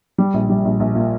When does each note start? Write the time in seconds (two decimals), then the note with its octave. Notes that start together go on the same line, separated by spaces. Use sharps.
0.18 G3
0.34 A#1
0.50 G3
0.65 A#1
0.80 A#1
0.95 A#2